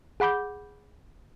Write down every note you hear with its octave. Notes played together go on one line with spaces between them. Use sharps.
G#4 F#5 B5 D6 G6